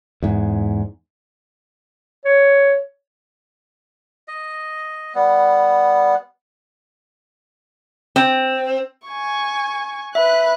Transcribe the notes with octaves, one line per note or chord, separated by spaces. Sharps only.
E2 G#2
C#5
D#5
G3 B3
C4
G#5 C#6
B4 E5 F#6